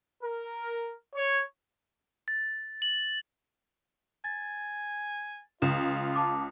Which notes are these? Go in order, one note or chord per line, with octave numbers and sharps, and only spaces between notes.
A#4
C#5
A6
F#7
G#5 A6
C#2 F4 E7
A5 D6 D#6